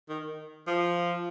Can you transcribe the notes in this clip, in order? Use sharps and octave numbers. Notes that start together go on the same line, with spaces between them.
D#3
F3